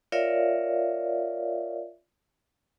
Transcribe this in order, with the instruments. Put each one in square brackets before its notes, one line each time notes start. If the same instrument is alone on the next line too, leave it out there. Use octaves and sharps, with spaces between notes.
[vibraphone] F4 A#4 C#5 D5 E5 F5